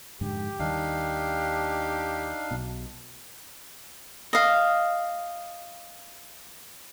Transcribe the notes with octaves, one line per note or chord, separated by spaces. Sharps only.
F2 G#2 D3 G4
D#2 D#3 G3 D4 D#4 F5
B1 B2
D#5 F5